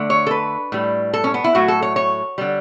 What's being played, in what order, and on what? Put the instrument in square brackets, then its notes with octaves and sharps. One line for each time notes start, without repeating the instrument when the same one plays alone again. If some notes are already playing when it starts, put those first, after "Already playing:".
Already playing: [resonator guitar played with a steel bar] D3 A3
C#5
A4
B4
A2 G3
A4
C#4
B3
E4
A2 F#3 A3 F#4
A4
C#5
C#5
D3 G3